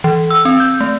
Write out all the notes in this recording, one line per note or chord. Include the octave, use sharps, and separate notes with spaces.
E3
E6
C4
G6
A3